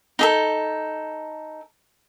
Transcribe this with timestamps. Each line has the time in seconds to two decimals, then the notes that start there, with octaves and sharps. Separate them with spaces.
0.19 D#4 G#4 A4